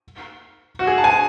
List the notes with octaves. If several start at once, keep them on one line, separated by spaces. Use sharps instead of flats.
F#4
G#4
A5
G#5